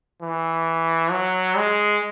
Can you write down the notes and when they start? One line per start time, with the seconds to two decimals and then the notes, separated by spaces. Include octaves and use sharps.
0.22 E3
1.11 F#3
1.57 G#3